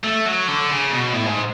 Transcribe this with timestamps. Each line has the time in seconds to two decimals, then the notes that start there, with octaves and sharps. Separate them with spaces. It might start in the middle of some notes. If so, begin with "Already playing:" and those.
0.04 A3
0.25 F#3
0.48 D3
0.70 C#3
0.92 B2
1.14 A2
1.27 G#2